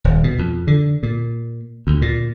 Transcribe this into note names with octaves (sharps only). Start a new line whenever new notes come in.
D#1
B2
F2
D3
A#2
D2
A#2